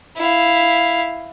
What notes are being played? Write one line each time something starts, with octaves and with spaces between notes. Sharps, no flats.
E4 F5